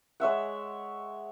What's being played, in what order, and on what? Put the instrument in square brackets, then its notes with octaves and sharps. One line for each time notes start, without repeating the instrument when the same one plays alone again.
[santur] G#3 C#5 E5 F#5